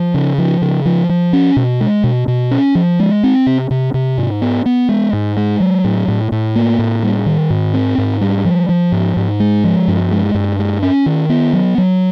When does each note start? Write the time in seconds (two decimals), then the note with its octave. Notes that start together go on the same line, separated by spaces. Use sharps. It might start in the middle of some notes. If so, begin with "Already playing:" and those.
Already playing: F3
0.14 C#3
0.38 F3
0.62 C#3
0.86 F3
1.09 F3
1.33 C#4
1.56 B2
1.81 G#3
2.04 B2
2.28 B2
2.51 C#4
2.75 F3
3.00 G#3
3.24 C4
3.46 C3
3.71 C3
3.94 C3
4.18 G#2
4.42 B3
4.66 B3
4.89 G#3
5.13 G#2
5.37 G#3
5.60 F#3
5.84 A2
6.08 A2
6.32 A2
6.56 A#3
6.79 A2
7.03 G3
7.26 D#3
7.50 G#2
7.74 C4
7.98 G#2
8.21 G3
8.45 F3
8.69 F3
8.92 G#2
9.17 G#2
9.40 G#3
9.64 F3
9.88 G2
10.11 G#3
10.35 G2
10.59 G#3
10.82 C#4
11.06 D#3
11.29 B3
11.53 F#3
11.78 F#3